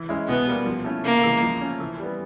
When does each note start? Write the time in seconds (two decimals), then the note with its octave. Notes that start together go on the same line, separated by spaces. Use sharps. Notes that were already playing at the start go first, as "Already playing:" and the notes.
Already playing: E3
0.09 G#3 C#4 E4
0.28 B2 B3
0.47 G3 A#3
0.66 F3
0.85 A3 C#4 E4
1.04 C#3 A#3
1.24 E3 G#3
1.43 F3
1.61 A3 C#4
1.80 E3
1.99 G3 B3